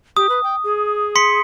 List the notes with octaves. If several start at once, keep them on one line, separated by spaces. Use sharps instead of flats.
G4 D#6
B4
G5
G#4
C6 B6 C#7